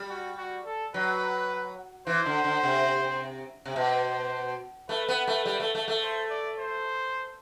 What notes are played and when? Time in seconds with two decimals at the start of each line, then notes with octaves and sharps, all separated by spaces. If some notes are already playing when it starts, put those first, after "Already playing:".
Already playing: G3
0.09 F#4
0.38 F#4
0.66 A4
0.94 F#3 B4
2.07 E3 C5
2.26 D3
2.44 D3
2.63 C3
3.65 C3
3.76 B2 C5
4.89 A3 B4
5.08 B3
5.27 A3
5.45 G3
5.60 A3
5.75 A3
5.88 A3
6.02 C5
6.30 D5
6.59 C5